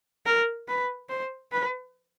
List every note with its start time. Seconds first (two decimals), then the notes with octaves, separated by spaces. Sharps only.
0.26 A#4
0.68 B4
1.09 C5
1.52 B4